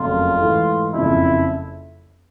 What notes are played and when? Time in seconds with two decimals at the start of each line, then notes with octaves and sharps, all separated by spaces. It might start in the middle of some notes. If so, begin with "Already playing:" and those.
Already playing: F#1 F2 C#3 F#3 A3 F4
0.37 G#2 E3 A3
0.94 F#1 F2 C#3 E4